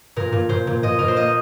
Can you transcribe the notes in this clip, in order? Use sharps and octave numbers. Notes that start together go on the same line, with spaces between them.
A#2 A#4
A#2
A#2 C5
A#2
A#2 D#5
A#2 A#4
C5
A#3 D#5